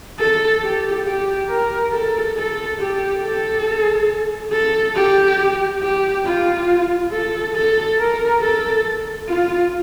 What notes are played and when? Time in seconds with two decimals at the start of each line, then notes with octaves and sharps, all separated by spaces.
0.19 A4
0.63 G4
1.06 G4
1.49 A#4
1.92 A4
2.36 A4
2.79 G4
3.22 A4
4.52 A4
4.95 G4
5.82 G4
6.25 F4
7.11 A4
7.56 A4
7.99 A#4
8.42 A4
9.28 F4